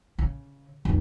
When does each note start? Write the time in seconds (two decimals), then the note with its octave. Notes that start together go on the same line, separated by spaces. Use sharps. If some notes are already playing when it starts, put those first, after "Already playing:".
0.18 C#3
0.85 F1 G3